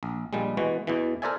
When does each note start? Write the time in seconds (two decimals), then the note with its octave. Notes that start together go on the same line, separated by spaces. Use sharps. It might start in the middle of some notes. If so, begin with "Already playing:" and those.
0.03 A#1
0.33 A#1 A#2 G3 G#3
0.57 B2 E3 G#3 F#4
0.87 E2 B2 E3
1.22 A4 A#4 C5 D5 E5 G#5